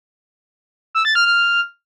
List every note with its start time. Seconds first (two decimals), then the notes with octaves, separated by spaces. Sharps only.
0.95 E6
1.05 A6
1.15 F6
1.26 F6